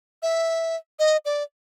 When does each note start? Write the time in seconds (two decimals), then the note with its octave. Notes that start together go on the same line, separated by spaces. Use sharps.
0.23 E5
0.99 D#5
1.25 D5